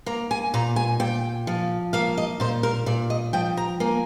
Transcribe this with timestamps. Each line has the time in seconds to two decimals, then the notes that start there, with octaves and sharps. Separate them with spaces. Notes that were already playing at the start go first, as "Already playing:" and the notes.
0.06 A#3 A#5
0.31 G#5
0.54 A#2 A#5
0.76 G#5
1.00 A#2 G5
1.47 F3
1.93 A#3 F5
2.18 D#5
2.40 A#2 C5
2.63 A#4
2.86 A#2 D5
3.10 D#5
3.33 F3 G5
3.57 A#5
3.80 A#3 G#5